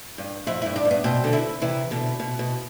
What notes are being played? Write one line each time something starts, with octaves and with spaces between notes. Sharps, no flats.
G2
F2 E4
G2 E4
D4
G2
B3
B2 C4
B2 D3
E4
C3 E3 E4
B2 D3
B2
B2